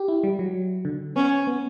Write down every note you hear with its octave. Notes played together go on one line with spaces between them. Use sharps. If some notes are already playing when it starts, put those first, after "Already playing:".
Already playing: G4
E4
G3
F#3
D3
B3 C#4
B3